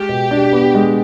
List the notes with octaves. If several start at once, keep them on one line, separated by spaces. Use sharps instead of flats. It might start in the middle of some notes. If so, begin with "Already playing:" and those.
Already playing: G#3 G4
B2
D4
B3
G#3